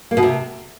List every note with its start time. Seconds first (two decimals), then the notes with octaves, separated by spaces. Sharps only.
0.11 A#3
0.17 B2
0.23 C3